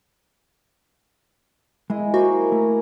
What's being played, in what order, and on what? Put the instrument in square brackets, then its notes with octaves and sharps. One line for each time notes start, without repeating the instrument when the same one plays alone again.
[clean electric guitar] G#3 [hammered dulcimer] E4 G#4 D#5
[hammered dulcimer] A#3 E4 [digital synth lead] F#4 [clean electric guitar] C5
[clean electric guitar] A3 [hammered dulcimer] A#5